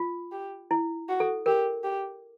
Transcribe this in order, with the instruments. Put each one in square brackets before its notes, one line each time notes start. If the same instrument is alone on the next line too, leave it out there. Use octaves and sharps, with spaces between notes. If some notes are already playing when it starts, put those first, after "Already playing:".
Already playing: [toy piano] F4
[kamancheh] G4
[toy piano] E4
[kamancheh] F#4
[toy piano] A4
[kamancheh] G4 [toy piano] A#4
[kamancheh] G4